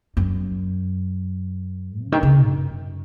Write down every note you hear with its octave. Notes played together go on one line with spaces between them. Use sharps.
F#2
C#3
D#3
C#3
F#2